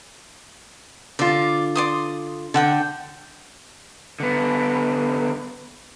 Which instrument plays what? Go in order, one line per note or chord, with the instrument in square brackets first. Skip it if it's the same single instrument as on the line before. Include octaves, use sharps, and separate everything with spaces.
[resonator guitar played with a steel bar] D3 F4 [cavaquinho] D5
[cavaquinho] D5 C6 D#6
[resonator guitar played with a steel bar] D3 [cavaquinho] A4 F#5 G5
[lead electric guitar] D3 B3